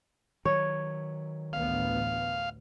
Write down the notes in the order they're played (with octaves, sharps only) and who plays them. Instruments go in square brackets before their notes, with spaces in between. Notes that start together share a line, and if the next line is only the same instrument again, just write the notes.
[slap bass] D#3 F#3 [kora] C#5
[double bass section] A1 D2 B3 [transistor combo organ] F5